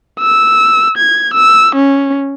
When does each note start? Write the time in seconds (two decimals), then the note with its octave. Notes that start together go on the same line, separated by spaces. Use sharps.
0.19 E6
0.98 G#6
1.34 E6
1.76 C#4